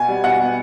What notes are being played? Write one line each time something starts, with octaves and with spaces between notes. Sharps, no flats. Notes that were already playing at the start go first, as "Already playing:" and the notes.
Already playing: B2 G#5
G3 B3
B2 F#5
G3 B3